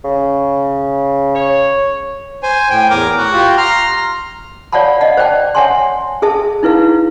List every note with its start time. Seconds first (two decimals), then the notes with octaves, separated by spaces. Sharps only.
0.04 C#3
1.35 C#5
2.43 C5 G#5
2.70 A2 G5 G#5
2.90 E2 A#4 D6
3.18 A2 F#4
3.33 F4 G4
3.58 A#5 C6 F6
4.73 C#5 D5 F5 F#5 A5 B5
5.01 D#5 F5 F#5 A5
5.17 C5 D5 G5 A5
5.55 C#5 E5 F#5 G#5 A5 C6
6.22 G#4 A4 E5 A5
6.63 D#4 E4 B4 F5